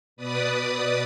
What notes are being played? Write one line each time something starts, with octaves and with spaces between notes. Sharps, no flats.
B2 B4 D5 D#6